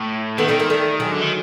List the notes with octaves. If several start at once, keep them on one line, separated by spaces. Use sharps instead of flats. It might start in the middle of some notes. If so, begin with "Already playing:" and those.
Already playing: A2
D#3 A3 B3
G3 A3
G#3 A#3
G3 A3
F#3 G#3
D3
D#3